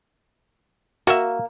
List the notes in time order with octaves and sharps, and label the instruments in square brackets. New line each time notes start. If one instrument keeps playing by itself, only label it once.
[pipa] A#3 [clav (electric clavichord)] F#4 E5